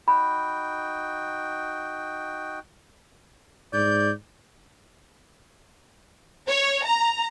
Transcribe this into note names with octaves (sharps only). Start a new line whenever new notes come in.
D#4 F#4 G5 B5
G#2 D5 G6
C#5
A#5